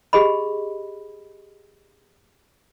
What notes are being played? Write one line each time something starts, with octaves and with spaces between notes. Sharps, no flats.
G4 G#4 D#5 B5